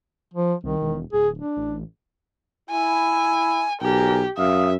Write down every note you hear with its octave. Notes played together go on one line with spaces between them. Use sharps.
F3
C2 D#3
E1
D1 G#4
D4
A1
E4 G#5
B1 G4 A#4 G#5
F#2 E5 F5 D#6